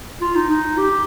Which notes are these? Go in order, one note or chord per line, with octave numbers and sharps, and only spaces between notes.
F4
D#4
D#4
G4